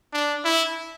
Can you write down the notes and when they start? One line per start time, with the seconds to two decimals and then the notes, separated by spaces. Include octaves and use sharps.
0.13 D4
0.45 E4